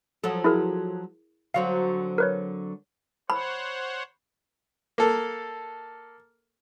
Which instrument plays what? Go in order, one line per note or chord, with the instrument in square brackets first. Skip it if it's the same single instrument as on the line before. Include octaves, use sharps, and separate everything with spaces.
[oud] F3 F#3 A4
[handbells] E4 G#4 A#4
[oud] D3 F#3 C4 [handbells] F5
[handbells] A#4 B4 C#5
[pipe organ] C5 C#5 F#5 [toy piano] B5
[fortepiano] A#3 A4